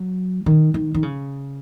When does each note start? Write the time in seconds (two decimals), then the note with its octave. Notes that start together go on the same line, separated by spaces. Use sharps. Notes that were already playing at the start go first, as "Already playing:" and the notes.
Already playing: F#3
0.46 D#3
0.74 D#3
0.94 D#3
1.03 C#3